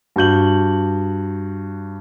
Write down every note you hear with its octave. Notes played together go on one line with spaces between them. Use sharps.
G2 F#4 G6 F#7